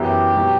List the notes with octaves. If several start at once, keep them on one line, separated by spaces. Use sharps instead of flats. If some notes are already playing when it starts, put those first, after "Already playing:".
Already playing: F#2 E3 B3 E4 G4
B2 F#3